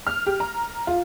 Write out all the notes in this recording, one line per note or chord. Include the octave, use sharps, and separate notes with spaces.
F6
G4
A#5
F4